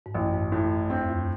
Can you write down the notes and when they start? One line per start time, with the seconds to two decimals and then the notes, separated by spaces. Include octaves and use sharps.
0.06 G#2
0.14 A1 F#2
0.34 G#2
0.52 F#2 A2
0.90 E2 C4
1.01 E2
1.09 F#2